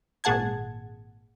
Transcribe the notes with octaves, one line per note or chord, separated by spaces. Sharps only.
G#1 A#2 G#4 F#5 A5 G#6